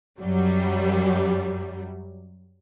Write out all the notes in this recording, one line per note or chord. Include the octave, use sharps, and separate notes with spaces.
F#2 F#3 G3